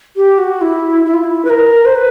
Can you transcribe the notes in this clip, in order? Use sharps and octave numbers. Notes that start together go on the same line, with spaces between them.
G4
F#4
E4
E4
F4
E4
B4
A#4
C5
B4